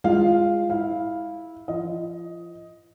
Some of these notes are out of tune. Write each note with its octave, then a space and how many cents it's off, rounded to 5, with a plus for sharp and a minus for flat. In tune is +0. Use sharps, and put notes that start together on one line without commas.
G#3 -10 F4 -10 F5 +0
E4 -15 F5 +0
F3 -30 D#5 +10